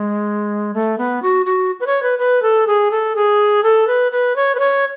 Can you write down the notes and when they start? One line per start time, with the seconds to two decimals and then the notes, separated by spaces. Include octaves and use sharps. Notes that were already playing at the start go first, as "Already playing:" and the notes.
Already playing: G#3
0.74 A3
0.98 B3
1.22 F#4
1.46 F#4
1.80 B4
1.87 C#5
2.03 B4
2.19 B4
2.42 A4
2.67 G#4
2.91 A4
3.16 G#4
3.63 A4
3.87 B4
4.12 B4
4.36 C#5
4.55 B4
4.59 C#5